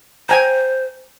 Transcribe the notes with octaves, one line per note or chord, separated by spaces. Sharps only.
C5 G5 G#5 A#5